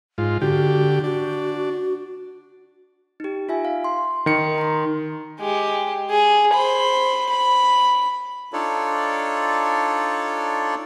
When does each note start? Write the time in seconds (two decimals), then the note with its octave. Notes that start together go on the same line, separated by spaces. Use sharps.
0.18 G#2 F4
0.42 D3 F#4 G4
1.04 D4 F#4
3.20 D#4 G4
3.49 F4 E5 G#5
3.65 F5
3.84 C6
4.26 D#3 C#7
4.58 A#5 C6
5.40 G#3 G4
6.10 G#4
6.54 C5 B5
7.30 B5
8.53 D4 D#4 F4 A4 C#5 D5